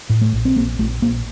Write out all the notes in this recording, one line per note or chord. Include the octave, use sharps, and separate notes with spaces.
A2
A3
A#1
C4
A#1 A#3
A#1 A3
A#1 A#3